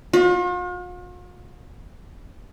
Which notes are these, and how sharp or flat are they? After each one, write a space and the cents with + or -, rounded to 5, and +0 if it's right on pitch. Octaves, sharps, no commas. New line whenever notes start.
F4 +45